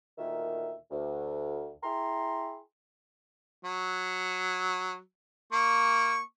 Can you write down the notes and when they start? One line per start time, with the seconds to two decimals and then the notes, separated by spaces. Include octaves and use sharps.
0.17 D2 A#2 D#3 E5
0.91 D2
1.82 E4 G#4 G5 A#5 C6
3.65 F#3
5.52 A#3 C#6